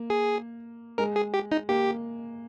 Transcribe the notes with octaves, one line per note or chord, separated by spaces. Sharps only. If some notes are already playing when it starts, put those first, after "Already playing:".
Already playing: A#3
G#4
G#3 A#4
G#4
G4
D#4
A#3 G4